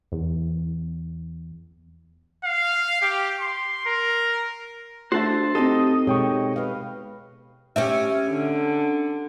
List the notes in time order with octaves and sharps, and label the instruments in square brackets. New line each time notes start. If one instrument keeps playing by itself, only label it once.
[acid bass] E2
[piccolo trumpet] F5
G4
C6
A#4
[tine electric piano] A3 D4 [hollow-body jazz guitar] F#4 A4 E5 [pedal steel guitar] C5 A5
[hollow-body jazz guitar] C4 D#4 A4 [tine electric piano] G4 A5 [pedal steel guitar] D#5
[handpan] B2 G#3 G4 [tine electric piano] C#5 G5 C#6
[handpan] B4 F5
[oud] C#4 G4 E5
[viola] D3